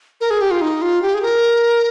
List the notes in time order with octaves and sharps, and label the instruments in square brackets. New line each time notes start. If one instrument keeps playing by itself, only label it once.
[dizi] A#4
G#4
G4
F4
D#4
F4
G4
G#4
A#4